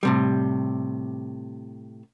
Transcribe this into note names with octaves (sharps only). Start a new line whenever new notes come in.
A2 C3 G3